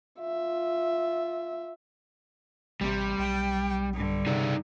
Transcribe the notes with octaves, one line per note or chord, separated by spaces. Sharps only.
F4 E5
A1 C3 G3
B1 G5
G2 D3
C3 D#4 G#4 D5